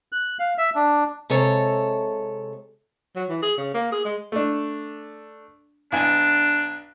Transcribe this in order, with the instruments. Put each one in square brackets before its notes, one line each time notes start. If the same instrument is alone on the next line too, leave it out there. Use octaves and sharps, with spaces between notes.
[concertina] F#6
F5
E5
D4
[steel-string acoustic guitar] C3 G#3 A4 C#5 A#5
[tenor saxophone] F#3
E3
G#4
C#3
A#3
G#4
G#3
[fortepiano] A3 D4
[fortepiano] B1 G#5 [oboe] D4